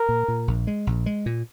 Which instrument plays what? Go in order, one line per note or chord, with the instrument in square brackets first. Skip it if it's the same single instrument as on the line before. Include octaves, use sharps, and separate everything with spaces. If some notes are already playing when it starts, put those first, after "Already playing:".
Already playing: [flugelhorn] A#4
[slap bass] A#2
A#2
A#1
G#3
A#1
G#3
A#2